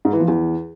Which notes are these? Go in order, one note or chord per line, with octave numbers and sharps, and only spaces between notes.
G#2
E3
F3
E2